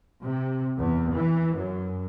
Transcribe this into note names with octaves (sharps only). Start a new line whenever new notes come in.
C3
E2
E3
F#2